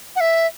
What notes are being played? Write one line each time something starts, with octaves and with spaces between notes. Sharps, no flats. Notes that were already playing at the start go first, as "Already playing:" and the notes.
F#5
E5